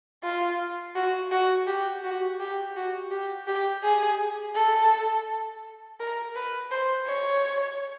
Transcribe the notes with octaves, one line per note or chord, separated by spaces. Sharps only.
F4
F#4
F#4
G4
F#4
G4
F#4
G4
G4
G#4
A4
A#4
B4
C5
C#5